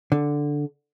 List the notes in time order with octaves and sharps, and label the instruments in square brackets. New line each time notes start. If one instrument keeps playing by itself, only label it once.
[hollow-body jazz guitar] D3